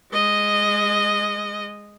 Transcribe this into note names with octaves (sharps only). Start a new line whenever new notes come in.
G#3 D#5